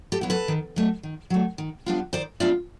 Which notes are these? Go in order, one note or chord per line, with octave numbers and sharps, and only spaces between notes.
G4 A4
F#3 B3 E4
A4 B4
D#3
F#3 A3
D#3
F#3 A3
D#3
G3 B3 D4 F4
D#3 C5 D5
G3 B3 D4 F4 D5 E5